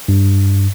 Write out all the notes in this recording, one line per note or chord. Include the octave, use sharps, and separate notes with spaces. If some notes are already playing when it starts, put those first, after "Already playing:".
G2